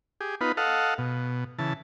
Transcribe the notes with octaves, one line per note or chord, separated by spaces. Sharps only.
G4 G#4
B3 D#4 F4 B4
A4 D#5 F5 F#5
B2
C#3 E3 A5